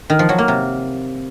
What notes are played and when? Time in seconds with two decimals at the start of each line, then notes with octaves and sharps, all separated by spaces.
0.10 D#3
0.19 F3
0.29 F#3
0.38 A#3
0.48 C3